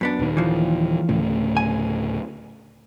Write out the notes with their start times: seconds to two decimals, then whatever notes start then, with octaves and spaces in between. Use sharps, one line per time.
0.01 F#2 B3 D4
0.19 D#1 D#3
0.37 E3 F3
1.09 D2 A2 C#3
1.57 G#5